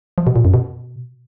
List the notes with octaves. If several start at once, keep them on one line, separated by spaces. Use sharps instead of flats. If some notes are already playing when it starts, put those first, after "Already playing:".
F3
B2
A#2
F#2
B2